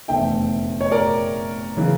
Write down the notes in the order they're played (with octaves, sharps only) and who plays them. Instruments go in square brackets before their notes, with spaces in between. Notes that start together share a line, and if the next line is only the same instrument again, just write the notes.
[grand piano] F1 E2 D3 A3 E5 G5
C#5
A#4 D5
C#3 E3